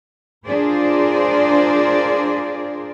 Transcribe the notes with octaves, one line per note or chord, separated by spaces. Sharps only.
D4 F4 G#4 A#4 C5 D5